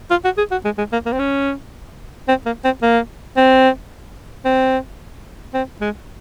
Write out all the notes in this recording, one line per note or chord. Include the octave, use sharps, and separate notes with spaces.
F4
F#4
G#4
F#4
G#3
G#3
A#3
A#3
C4
C#4
C4
A#3
C4
A#3
C4
C4
C4
G#3